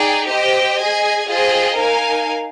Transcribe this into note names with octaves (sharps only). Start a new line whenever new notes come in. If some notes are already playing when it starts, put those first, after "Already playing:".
Already playing: D#4 G#4 D5 G5
G4 C5 D#5 G5
G#4 D#5 G#5
F4 G#4 C5 D#5 G5
D#4 A#4 F5 G#5